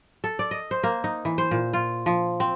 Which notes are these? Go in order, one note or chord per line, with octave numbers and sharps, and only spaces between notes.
A4
D5
D#5
C5
A#3
D#4
E3
C5
A#2
F4
F3
C4